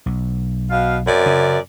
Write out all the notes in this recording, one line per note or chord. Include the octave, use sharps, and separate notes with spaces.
B1
B2 F5
F#2 C3 D5
C#3